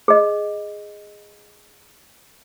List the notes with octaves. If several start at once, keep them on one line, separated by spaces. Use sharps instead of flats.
G#4 D#5